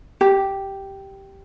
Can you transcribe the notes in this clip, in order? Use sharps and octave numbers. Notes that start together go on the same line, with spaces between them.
G4